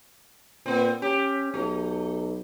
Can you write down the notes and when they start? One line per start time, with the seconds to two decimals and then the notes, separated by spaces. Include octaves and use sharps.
0.66 A#2 B3 C4
1.02 C#4 G4
1.54 B1 A3